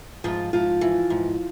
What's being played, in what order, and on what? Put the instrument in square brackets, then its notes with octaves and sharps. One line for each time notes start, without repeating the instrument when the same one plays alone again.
[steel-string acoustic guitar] G#2 F3 F4
G#2 F3 F4
E3
G#2